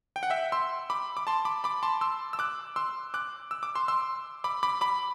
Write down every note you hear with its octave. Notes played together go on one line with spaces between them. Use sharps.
G5
F#5
E5 G5
C6 E6
B5 D6
D6
A5 C6
B5 D6
B5 D6
A5 C6
C6 E6
E6
D6 F#6
C6 E6
D6 F#6
E6
D6
C6 E6
C6 E6
B5 D6
B5 D6
B5 D6